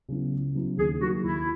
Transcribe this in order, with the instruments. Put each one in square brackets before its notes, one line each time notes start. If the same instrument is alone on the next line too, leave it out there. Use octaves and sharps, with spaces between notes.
[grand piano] C#3 F#3 B3 E4
C#2
C#3 F#3 B3 E4
[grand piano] D#2 [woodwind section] G#4
[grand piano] D#3 F#3 A#3 [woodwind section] F#4
[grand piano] D#2 [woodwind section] E4